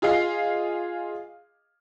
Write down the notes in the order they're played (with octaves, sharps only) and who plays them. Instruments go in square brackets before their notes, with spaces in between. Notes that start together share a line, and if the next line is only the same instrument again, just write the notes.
[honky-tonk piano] F4 G#4 D#5 F5 C7